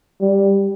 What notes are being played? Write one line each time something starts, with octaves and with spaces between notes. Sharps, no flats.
G3